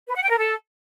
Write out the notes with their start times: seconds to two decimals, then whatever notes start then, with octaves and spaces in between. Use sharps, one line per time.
0.08 B4
0.15 F#5
0.23 G5
0.30 A#4
0.37 A4